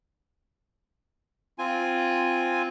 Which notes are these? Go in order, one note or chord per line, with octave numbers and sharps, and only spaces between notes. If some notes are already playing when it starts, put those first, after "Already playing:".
C4 F4 G#5